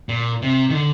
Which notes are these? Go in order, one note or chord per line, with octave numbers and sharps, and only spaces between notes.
A#2
C3
D#3
D3